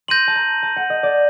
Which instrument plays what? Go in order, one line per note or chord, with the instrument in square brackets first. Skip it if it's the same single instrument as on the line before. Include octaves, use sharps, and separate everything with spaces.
[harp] C6 [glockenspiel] G6 A#6 D#7 F#7
[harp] A5
A#5
A5
F#5
D#5
D5